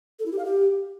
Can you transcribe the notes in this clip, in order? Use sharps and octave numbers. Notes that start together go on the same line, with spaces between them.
A4
E4
G4
F5
G4